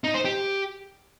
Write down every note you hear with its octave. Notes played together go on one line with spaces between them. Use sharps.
D#4
C5
G4